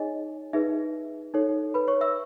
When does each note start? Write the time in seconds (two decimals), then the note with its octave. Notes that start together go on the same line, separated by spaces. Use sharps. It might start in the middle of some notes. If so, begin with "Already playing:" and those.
Already playing: D#4 G#4 C#5 D#5 G#5
0.53 D#4 G#4 B4 E5
1.34 D#4 A4 C#5
1.74 B4 B5
1.88 C#5 C#6
2.01 E5 E6